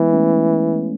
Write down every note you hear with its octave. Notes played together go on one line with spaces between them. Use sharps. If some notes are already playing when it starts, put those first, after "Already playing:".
Already playing: E3 G#3 B3
A3 C#4